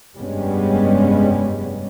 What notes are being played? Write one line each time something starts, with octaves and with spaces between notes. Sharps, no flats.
F1 G2 G3 G#3 B3 C#4